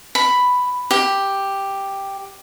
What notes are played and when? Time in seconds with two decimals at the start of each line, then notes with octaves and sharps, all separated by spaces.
0.15 B5
0.91 G4